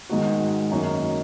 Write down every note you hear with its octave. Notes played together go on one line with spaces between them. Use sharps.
G#2 D#3 G#3 D#4 F#4
F#2 D#3 A#3 D#4 F#4